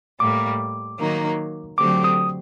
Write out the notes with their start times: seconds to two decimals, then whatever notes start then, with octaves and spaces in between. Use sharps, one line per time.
0.20 A2 G3 A#3 D6
0.99 D#3 F#3 A#3 D#4
1.78 D3 F#3 A3 C4 G4 D6
2.04 D#6